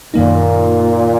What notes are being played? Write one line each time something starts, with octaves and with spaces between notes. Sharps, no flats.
F#2 A#2 D#3 A#3 D#4